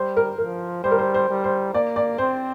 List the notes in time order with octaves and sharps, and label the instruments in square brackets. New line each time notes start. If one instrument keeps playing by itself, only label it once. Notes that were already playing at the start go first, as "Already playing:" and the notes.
Already playing: [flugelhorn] G3 [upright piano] C5
[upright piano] A#4
[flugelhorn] F3 [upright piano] A#4
[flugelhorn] G3 [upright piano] C5
[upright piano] A#4
C5
C5
[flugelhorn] G3
[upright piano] C5
[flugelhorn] A#3 [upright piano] D5
[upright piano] D5
[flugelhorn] C4 [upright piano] C5